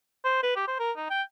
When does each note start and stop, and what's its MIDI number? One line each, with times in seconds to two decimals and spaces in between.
0.25 0.42 72
0.43 0.55 71
0.56 0.68 67
0.68 0.79 72
0.80 0.92 70
0.97 1.08 63
1.10 1.22 79